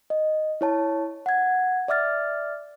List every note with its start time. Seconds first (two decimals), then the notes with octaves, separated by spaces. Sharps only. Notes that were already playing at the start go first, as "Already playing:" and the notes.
0.10 D#5
0.61 E4 C#5 A5
1.26 F#5 G#6
1.88 D5 E5 D6 F6 A6